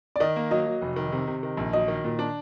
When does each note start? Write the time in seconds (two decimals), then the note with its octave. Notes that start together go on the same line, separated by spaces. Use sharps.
0.16 D5
0.20 D#3 D#5
0.36 A#3
0.51 F#3 D#5
0.66 F#3
0.81 F1
0.96 D#3
1.12 C3
1.27 C3
1.43 D#3
1.57 A#1
1.73 F#3 D#5
1.88 D#3
2.04 A#2
2.19 D4